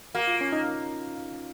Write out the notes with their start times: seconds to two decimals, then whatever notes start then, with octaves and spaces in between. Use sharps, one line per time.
0.15 A#3 F#4
0.27 F4
0.41 C#4
0.53 D#4